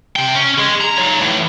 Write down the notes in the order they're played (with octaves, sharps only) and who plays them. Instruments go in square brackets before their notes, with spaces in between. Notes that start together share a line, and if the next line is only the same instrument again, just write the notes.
[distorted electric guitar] C3 G5
C#4
G#3 G#4
A#5
D#4 C#5
A2 E3